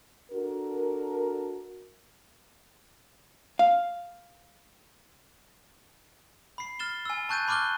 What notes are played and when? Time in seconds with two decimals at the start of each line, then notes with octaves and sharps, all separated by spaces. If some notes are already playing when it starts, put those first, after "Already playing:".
0.32 D4 F#4 A4 A#4
3.59 F5
6.58 B5 C7
6.79 F6 A6 E7 G7
7.05 G#5 E6
7.29 A5 C#6 F#6 G6 A6 D#7
7.48 B5 C#6 D6 F6 F#6 G7